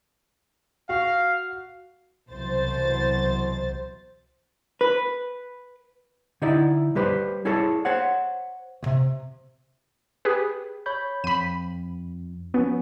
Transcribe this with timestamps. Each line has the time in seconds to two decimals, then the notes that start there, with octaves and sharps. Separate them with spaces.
0.89 F#4 F5
2.31 C2 B2 E3 F#3 C5 A6
4.81 B4
6.42 D3 D#4 E4 D5
6.95 G3 G4 B4 C5
7.45 E4 G#4 A4 C#5 D5 A5
7.85 C5 C#5 F#5
8.83 C#2 C3
10.25 G4 G#4 B4
10.86 C#5 B5 G6
11.24 F2 B5 D#7
12.54 F3 B3 C#4 F#4